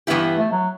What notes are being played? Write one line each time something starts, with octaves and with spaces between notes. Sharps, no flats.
G2 E3 B3 E4 G4
A3
F#3